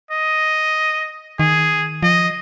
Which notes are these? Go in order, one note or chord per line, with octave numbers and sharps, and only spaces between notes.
D#5
D#3 G#4
F3 D#5